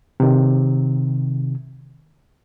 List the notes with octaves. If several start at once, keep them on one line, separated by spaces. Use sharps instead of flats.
C3 D#3